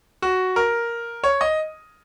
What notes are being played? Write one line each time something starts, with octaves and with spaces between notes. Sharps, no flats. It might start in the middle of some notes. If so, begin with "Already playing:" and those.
F#4
A#4
C#5
D#5